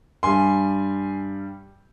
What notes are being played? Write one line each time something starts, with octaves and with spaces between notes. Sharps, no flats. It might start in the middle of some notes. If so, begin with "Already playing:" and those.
G2 G3 G#5 C6